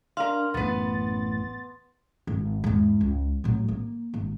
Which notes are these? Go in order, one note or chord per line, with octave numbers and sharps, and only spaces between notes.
D4 A#4 F5 C6
A1 F#2 B3 B4 A6
G#1
E2 G#2
C#2
A2 F#3
A#3
G#1